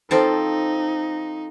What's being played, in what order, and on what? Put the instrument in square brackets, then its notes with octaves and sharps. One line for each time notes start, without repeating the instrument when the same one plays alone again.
[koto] F3 C4 A4 [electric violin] D#4